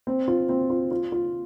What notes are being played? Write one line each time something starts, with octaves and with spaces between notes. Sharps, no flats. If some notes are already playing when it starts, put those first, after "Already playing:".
C4
F4
C4
F4
F4
F4